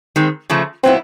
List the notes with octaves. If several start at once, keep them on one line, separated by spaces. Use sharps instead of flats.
D#3 G#3 C4
C#3 F3 A3
A#2 F#3 B3 C4 E4